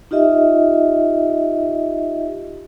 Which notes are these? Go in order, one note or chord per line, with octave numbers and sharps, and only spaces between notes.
D#4 F4 G4 D#5 E5